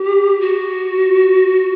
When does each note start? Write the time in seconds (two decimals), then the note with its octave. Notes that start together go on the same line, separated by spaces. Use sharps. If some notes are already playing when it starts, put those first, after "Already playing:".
Already playing: G4
0.41 F#4